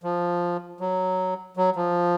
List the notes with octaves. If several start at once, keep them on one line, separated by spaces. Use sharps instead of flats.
F3
F#3
F#3
F3